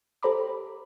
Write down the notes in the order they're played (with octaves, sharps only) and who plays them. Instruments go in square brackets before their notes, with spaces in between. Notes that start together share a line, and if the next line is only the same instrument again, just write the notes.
[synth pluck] G4 A4 C5 A#5 B5 D6